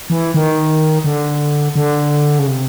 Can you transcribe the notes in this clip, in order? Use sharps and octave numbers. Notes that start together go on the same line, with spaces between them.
E3
D#3
D3
D3
C#3
C3